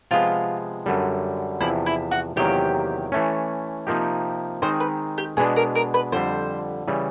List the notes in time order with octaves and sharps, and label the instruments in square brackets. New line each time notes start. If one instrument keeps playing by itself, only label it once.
[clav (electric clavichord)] C3 F3 G#3 B3 [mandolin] F4
[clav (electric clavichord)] F#2 D3 G3
[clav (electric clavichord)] E2 C3 F3 [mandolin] E4
[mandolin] E4
F#4
[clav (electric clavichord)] E2 C3 D#3 F#3 A#3 [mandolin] G4
[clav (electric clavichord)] E3 A3 C#4
C3 F3 A#3 D#4 G4
[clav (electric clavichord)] D#3 G#3 C4 D#4 [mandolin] C5
[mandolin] B4
G4
[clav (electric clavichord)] B2 G#3 B3 D4 [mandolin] G#4
[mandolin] A#4
A#4
B4
[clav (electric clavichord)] F2 D3 G3 [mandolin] C5
[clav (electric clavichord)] C#3 E3 G3